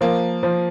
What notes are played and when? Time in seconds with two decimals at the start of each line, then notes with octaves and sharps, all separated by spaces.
0.01 F3 A#3
0.43 F3